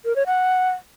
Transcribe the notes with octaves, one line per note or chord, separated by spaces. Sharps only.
A#4
C#5
F#5